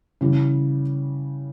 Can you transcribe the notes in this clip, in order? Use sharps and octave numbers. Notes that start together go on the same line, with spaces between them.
C#3 E3 G3